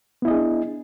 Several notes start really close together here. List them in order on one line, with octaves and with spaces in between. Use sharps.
B3 E4 D#5 G#4 D4